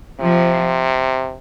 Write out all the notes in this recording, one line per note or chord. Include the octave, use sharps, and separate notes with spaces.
C3 F3